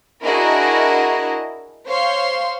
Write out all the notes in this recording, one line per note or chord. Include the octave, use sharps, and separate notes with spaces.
D4 E4 F#4 G#4 A#4 D#5
C5 C#5 F5 C6